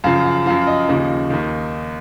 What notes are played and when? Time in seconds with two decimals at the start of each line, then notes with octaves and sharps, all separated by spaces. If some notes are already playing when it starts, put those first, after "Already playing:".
0.04 F#2 C#3 F3 F5
0.25 F5
0.46 F#2 F3 F5
0.67 D#5
0.89 D#2 C#3 F3
1.30 D#2 D#3